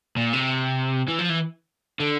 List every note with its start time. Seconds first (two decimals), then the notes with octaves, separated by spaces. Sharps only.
0.17 A#2
0.33 C3
1.08 E3
1.19 F3
1.29 E3
2.00 D3